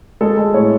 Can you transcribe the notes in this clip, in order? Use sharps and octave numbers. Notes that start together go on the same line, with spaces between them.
G#3 A4
G#3
A2 C#5